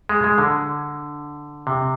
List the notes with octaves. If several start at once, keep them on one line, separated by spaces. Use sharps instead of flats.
G#3
G#3
D3
C3